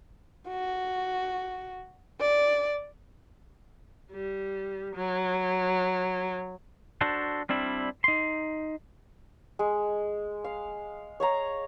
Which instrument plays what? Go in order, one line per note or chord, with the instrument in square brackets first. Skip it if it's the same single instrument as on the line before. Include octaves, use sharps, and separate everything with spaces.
[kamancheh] F#4
D5
[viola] G3
F#3
[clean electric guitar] D4 F#4 A4 C5
G3 C4 D4 E4
D#4 C6
[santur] G#3
F5
C#5 F5 A#5